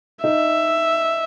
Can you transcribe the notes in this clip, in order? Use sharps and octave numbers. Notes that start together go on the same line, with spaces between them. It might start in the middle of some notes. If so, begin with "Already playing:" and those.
D#4 E5